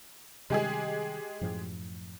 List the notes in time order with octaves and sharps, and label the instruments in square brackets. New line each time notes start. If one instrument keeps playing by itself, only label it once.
[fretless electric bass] C3 D#3 G3 [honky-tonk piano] G#3 G4 G#4
[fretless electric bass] F#2 A2 F3